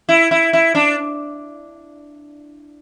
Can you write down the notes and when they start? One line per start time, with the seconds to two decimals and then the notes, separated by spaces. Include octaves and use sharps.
0.09 E4
0.31 E4
0.53 E4
0.75 D4